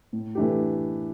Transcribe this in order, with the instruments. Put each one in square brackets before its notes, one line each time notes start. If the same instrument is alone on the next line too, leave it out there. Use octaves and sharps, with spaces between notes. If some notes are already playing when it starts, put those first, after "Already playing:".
[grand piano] A2
E3 A3 D4 G4